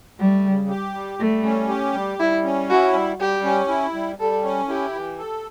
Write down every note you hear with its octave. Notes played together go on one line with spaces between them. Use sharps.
G3 A3
C#3
G4
G3
G3 A3
C#4
G4
G3
G3 E4
C#4
E4 F#4
G3
G3 G4
C#4
E4
G3
G3 A4
C#4
E4 G4
E3
A4